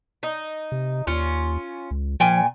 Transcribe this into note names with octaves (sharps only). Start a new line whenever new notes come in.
D#4
C3
D#2 C#4 F4
C#2
A#2 F3 G5 G#5